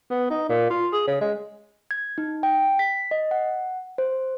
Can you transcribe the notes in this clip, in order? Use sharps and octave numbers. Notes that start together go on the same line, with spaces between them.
B3
D#4
A#2
F4
G#4
C#3
G#3
G#6
D#4
G5
B6
D#5
F#5
C5